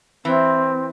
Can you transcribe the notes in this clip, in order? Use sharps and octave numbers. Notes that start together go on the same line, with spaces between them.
E3 C4